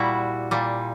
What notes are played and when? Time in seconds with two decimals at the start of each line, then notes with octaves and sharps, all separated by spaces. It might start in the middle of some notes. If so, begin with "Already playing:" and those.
Already playing: A#2 G3 E4 F#4
0.51 A#2 G3